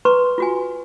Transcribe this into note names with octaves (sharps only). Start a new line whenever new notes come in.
B4 A#5 C6 C#6
F4 F#4 G#5